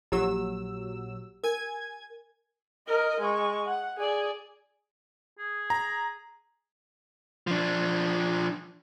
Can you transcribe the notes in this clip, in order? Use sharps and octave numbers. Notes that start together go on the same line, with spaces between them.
A#1 F#3 G4 A#5 E6
A#4 G#5 G#6
A#4 D#5
G#3 C#6
F#5
G#4 D5
G#4
A#5
F3 D4